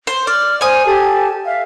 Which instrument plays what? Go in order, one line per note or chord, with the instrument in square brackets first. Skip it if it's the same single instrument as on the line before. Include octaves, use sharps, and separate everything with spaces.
[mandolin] C5
[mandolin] D5 [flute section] D6 F6
[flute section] C5 [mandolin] G#5 D#6
[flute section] G4 A4 A5
E5 F5